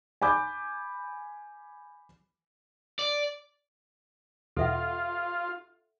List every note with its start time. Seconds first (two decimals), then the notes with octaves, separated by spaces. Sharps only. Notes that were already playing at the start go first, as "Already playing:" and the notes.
0.22 G#5 B5 D6 G6
2.99 D5
4.57 E2 B2 F4 A4 E5 F#5